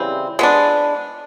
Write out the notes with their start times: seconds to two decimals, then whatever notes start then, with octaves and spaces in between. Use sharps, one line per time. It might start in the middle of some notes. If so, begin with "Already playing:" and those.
Already playing: C#3 E3 G3 C4
0.39 G#3 B3 D4